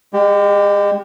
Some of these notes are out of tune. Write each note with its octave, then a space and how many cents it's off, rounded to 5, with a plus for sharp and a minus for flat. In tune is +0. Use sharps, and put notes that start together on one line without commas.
G#3 -35 G4 +0